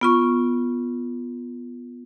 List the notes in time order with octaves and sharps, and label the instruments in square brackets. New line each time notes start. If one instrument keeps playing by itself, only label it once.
[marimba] B3 F4 C#6